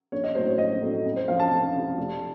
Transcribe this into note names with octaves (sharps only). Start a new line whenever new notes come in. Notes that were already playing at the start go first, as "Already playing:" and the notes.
A#1 C#5
D#5
A2 F#3 A3 C4 C5
C#5
A#1 D#5
A2 F#3 A3 C4
F2
C5
C3 F3 F5
A5
F2
C3 F3
F1